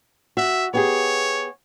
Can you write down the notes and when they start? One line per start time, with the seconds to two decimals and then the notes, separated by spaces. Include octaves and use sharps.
0.37 F#4 E5
0.74 B3 G4 G#4 C#5